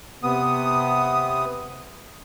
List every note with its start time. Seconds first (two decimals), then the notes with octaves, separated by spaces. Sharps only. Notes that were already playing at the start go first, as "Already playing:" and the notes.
0.23 C3 B3 D#6